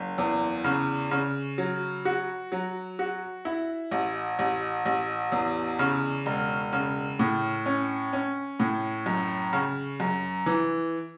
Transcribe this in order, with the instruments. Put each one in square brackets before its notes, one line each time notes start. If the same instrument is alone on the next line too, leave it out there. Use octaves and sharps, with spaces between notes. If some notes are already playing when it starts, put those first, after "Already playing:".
Already playing: [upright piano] F#1
E2
C#3
C#3
F#3
F#4
F#3
F#4
E4
A1
A1
A1
E2
C#3
E1
C#3
A2
C#4
C#4
A2
F#2
C#3
F#2
E3